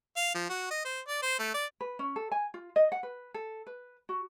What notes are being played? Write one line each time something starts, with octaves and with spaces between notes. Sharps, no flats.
F5
F3
F#4
D#5
C5
D5
C5
A3
D5
B4
C#4
A4
G#5
F4
D#5
F#5
B4
A4
B4
F#4